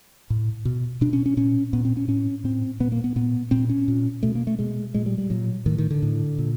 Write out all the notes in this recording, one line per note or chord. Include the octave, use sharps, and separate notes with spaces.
A2
B2
B2 D4
C#4
C#4
A#2 C#4
A#2 B3
C4
C#4
A2 C#4
A2 C4
A#2 B3
A#3
B3
A#2 B3
A#2 C4
C#4
A#2
B2 A3
A#3
A3
B2 G#3
A#2 G#3
G3
G3
A#2 F#3
A2 D#3
D#3
D3
A2
A#2